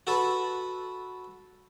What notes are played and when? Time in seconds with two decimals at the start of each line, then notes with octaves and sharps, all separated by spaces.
0.07 F#4 A4 B4